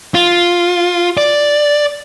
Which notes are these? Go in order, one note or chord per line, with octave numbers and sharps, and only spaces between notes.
F4
D5